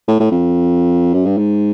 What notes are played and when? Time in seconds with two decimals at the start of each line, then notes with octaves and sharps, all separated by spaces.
0.08 A2
0.20 A2
0.31 F2
1.13 F#2
1.26 G2
1.37 G#2